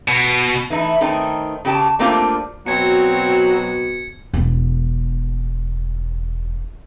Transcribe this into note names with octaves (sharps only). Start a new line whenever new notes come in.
B2
E3 A3 D#4 E4
D#3 A3 C4 D#4
C#3 G4 A4 A5
G3 A3 A#3 C4 D4 F4
B2 F#3 C4 G#6 C#7
E1 B3